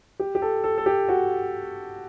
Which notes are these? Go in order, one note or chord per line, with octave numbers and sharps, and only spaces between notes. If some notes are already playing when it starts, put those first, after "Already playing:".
G4
G4
A4
A4
A4
G4
F#4